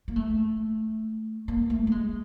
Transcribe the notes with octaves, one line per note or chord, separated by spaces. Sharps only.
A#3
A3
A#3
A3
A3
G#3